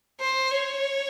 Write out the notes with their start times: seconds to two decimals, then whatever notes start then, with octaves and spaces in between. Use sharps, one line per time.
0.20 C5
0.52 C#5